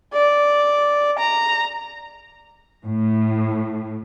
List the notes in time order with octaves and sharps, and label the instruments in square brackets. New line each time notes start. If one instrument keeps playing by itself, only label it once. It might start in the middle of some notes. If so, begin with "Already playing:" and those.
[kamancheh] D5
A#5
[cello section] A2